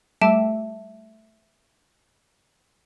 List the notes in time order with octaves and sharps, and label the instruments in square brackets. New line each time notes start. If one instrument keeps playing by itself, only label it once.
[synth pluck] G3 A3 [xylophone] E5 A5 D7